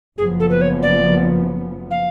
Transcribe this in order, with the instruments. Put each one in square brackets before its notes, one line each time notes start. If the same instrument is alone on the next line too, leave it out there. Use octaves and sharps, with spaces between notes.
[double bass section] F#1 F#2 F3 B3 [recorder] G#4
[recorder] A4
B4
C#5
D5
F5